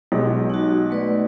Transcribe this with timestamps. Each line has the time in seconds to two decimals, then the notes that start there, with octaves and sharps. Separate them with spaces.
0.12 B1 B2 G#3 G4
0.50 D#4 F#4
0.90 A3 B4 D5